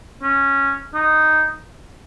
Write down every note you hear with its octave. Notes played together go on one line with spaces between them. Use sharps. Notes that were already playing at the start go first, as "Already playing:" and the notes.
C#4
D#4